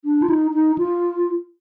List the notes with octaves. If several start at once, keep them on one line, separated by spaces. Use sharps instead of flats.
D4
F4
D#4
D#4
F4